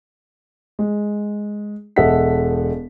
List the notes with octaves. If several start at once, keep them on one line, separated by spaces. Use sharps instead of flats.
G#3
E1 A4 D#5 E5 F#5 B6